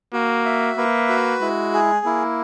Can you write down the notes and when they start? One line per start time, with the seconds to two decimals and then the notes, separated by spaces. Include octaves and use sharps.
0.13 A#3 F#4
0.45 E5
0.77 A#3 B4
1.09 F#4
1.41 G#3 E4
1.73 G#4
2.05 A#3 E4